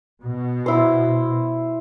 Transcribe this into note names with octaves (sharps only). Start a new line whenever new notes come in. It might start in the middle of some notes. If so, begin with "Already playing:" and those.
B2
E4 C5